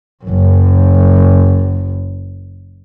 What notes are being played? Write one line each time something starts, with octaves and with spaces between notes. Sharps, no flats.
F#1 F#2